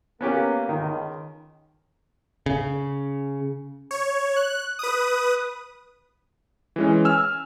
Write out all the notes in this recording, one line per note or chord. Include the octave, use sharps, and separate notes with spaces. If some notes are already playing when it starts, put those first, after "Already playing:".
A#3 B3 C#4 G4
C#2 D#3
C#3
C#5
F#6
B4 D#6
E3 G#3 C#4
G#5 E6 F6